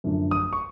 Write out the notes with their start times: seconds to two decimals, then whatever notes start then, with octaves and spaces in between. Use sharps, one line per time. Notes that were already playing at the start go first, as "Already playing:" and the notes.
0.04 F#2 D3 F3 A3 D4
0.31 D#6
0.53 C#6